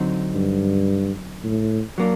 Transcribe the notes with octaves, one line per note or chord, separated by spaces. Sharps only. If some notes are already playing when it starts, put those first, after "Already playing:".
Already playing: D3 F#3 C4 D#4
G2
A2
F#3 A#3 D4